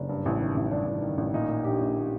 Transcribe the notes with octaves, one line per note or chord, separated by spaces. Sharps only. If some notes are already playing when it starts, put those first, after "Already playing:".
Already playing: F#1 D4
G2
A1
D#3
A1
G2 D4
A1
D#3
A1
A#2 D#4
A#2
A#1 G4
A#1
A#2